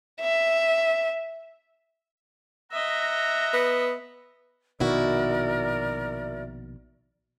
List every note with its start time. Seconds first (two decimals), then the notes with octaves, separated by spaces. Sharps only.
0.21 E5
2.72 D#5 E5 F#5 A#5
3.53 B3
4.80 A#1 B2 D#3 E4 F#4 A#4 D5